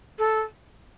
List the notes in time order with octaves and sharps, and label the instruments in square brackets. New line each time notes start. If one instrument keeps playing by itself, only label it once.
[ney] A4